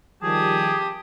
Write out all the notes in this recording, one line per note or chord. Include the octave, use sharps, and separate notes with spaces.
D#3 F3 G3 G4 G#4 A5 D#6